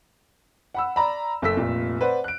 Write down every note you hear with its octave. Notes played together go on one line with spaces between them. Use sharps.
F#5 B5 E6
D5 A#5 B5
F#1 A4 E6 B6
F1 A#2
B4 C5 D5 F#5
F#6 D7